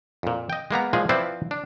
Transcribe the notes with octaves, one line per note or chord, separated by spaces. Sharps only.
F2 A#2
D#5 G5
G#3 A#3 B3 A#5
A#2 F3 G#3 G#4
F3 C4 E4 B4 C5 D5
D4